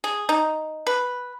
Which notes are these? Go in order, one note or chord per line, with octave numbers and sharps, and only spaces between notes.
G#4
D#4
B4